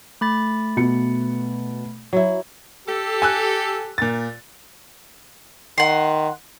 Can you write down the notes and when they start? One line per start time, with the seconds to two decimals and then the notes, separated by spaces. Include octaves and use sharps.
0.21 A3 B5 A6
0.77 B2 C#7
2.13 F#3 E4
2.87 G4 A4
3.22 G#5 E6 F#6
3.98 A#2 A6
5.78 D#3 F#5 C6